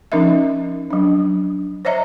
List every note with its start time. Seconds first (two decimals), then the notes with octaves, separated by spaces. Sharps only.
0.12 F3 C#4 D#4 A#4 D#5 E5
0.91 F#3 D4
1.85 C5 C#5 D#5 E5 A#5